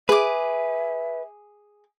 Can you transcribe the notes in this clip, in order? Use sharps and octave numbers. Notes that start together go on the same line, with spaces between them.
G#4 B4 E5 D6